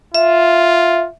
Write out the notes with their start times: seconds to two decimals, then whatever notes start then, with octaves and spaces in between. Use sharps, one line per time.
0.15 F4 E5